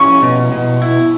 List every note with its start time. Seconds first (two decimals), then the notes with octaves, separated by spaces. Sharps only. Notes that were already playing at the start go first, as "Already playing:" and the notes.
Already playing: C#4 C#6
0.22 B2
0.52 B2
0.82 E4